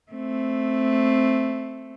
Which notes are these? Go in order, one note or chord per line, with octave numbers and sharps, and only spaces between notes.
A3 C4